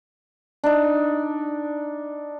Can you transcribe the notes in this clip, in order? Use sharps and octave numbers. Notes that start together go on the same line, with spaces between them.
D4 D#4